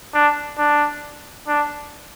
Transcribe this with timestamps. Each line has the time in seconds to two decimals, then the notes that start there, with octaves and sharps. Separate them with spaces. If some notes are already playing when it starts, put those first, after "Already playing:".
0.14 D4
0.58 D4
1.48 D4